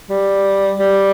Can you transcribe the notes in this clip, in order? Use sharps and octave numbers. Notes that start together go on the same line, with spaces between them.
G3
G3